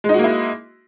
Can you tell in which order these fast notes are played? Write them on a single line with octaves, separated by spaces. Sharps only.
G#3 D#4 F#4 A#3 E4